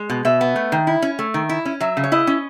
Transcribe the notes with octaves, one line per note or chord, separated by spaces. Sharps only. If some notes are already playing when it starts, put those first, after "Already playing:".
Already playing: G#3
B2
B2 E5
B3
A3
D#3
E4
C#4
A3
D#3
E4
C#4
F#3 E5
C#3
C#5
E4 D#5
C#4